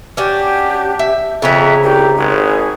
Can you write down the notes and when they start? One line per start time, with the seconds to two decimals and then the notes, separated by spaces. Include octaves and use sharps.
0.17 C#4 D4 F#4 G4
0.99 E5
1.42 F2 C#3 C#5 E5 A#5
1.83 C2 G4
2.17 G#1 G#4